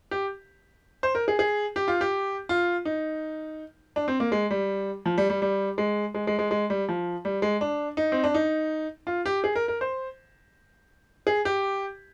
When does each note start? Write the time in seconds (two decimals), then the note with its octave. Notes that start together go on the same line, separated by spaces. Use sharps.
0.11 G4
1.03 C5
1.15 A#4
1.28 G#4
1.39 G#4
1.76 G4
1.88 F4
2.01 G4
2.49 F4
2.85 D#4
3.96 D4
4.08 C4
4.20 A#3
4.32 G#3
4.51 G3
5.06 F3
5.18 G3
5.30 G3
5.42 G3
5.78 G#3
6.15 G#3
6.27 G#3
6.39 G#3
6.51 G#3
6.70 G3
6.89 F3
7.25 G3
7.42 G#3
7.61 D4
7.97 D#4
8.12 C4
8.24 D4
8.34 D#4
9.07 F4
9.26 G4
9.44 G#4
9.55 A#4
9.68 A#4
9.81 C5
11.27 G#4
11.45 G4